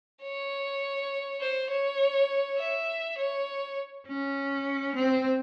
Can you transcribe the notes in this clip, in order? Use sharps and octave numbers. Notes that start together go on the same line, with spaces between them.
C#5
C5
C#5
E5
C#5
C#4
C4